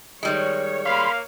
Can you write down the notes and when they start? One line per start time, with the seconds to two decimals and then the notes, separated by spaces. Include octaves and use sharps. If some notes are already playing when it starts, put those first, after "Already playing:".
0.23 D#3 G3 G#3 C#5
0.86 A#3 F5 B5 C6